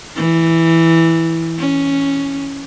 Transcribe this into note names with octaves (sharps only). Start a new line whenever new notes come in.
E3
C#4